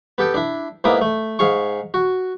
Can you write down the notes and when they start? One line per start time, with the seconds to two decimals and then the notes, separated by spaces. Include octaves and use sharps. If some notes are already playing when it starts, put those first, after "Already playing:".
0.18 B3 G4 A4 G5
0.34 D4 E4
0.84 G#2 A#3 B3 E4 D6 D#6
1.01 A3
1.39 G#2 G#4 F5 C#6
1.94 F#4